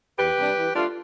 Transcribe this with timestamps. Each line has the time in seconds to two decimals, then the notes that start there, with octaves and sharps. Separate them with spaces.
0.19 E2 G4 B4
0.37 C3 G3 D4
0.56 E3
0.75 A3 D4 F4